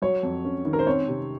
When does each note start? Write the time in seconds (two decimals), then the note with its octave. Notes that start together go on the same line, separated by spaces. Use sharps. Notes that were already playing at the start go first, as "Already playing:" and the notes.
0.02 F#3 C#5
0.23 F2
0.45 C#4
0.65 D#3
0.73 A#4
0.79 C5
0.87 C4 C#5
1.08 C3